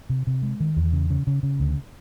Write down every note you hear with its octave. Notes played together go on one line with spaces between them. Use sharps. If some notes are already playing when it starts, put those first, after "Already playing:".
C3
C3
G#3
D#3
E2
C#3
C#3
C#3
C#3
D2